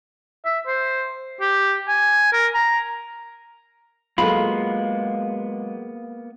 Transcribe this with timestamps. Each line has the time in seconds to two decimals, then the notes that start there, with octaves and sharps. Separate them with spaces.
0.45 E5
0.67 C5
1.41 G4
1.88 G#5
2.33 A#4
2.54 A#5
4.18 F#3 G#3 A#3 B3 F4 A4 B5